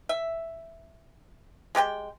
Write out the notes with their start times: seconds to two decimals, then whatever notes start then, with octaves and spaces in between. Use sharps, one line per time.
0.09 E5
1.75 G#3 G4 B4 G5